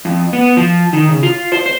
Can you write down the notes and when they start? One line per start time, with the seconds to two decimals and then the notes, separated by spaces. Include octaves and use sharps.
0.05 F2
0.33 B3
0.57 F3
0.93 D#3
1.09 C#3
1.23 F4
1.52 C5
1.66 C5